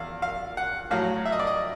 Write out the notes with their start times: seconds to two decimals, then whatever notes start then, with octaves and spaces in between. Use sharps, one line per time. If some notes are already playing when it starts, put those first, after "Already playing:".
Already playing: E2 F5
0.22 F5
0.57 F#5
0.91 A2 F#3 F5
1.26 E5
1.32 D#5
1.39 D5
1.47 D#5